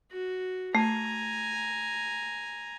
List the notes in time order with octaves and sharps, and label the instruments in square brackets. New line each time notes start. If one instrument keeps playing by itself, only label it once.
[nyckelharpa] F#4
[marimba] A3 [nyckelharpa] G#5 A#5